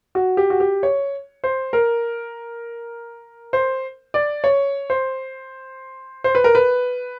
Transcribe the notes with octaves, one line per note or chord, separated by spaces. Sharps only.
F#4
G4
F#4
G4
C#5
C5
A#4
C5
D5
C#5
C5
C5
B4
A#4
B4